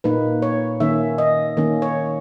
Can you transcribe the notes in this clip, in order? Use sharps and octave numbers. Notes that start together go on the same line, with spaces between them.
A#2 A#3 D#4 B4
C#5
D#3 A#3 C#4 E5
D#5
D#3 A#3 C#4
C#5